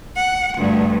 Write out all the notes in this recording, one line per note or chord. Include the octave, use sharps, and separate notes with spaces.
F#5
D2 G2